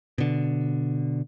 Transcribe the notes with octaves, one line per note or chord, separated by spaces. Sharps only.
B2 D3